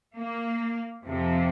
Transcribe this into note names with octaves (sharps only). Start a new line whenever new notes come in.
A#3
F2 C3 F3